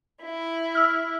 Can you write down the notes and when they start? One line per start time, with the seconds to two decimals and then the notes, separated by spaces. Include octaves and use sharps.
0.22 E4
0.75 E6 F6